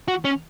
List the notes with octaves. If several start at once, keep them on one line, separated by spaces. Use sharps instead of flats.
F#4
C#4